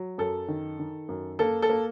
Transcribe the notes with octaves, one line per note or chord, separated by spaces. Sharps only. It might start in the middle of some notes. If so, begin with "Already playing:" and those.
Already playing: F#3
F#2 A4
D#3
D#3
F#2
A#3 A4
A4
A#3